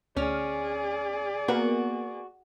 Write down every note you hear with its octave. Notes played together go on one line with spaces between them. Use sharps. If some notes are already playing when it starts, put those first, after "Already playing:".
D2 C#4 G#4 D5 F6
A#3 B3 F#4 A#4